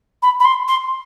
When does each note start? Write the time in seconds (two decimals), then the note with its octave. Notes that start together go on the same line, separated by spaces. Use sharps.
0.23 B5
0.40 B5
0.45 C6
0.68 C6